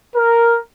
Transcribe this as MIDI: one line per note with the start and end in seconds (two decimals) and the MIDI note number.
0.15 0.57 70